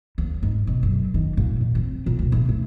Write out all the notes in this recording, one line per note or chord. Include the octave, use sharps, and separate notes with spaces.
D#2
G#2
B2
F#2
D#3
A#2
F2
C4
A#2
D2
B1
A3